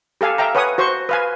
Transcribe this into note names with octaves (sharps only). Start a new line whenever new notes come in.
G4 A4 F5 G#5
E5 F5 G5 A#5
B4 C#5 F#5 G#5 D#6
F#4 C5 C#6
B4 F5 G#5